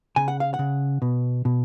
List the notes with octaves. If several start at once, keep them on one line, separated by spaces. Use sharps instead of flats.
C#3 G#5
F#5
F5
F#5
C#3
B2
B2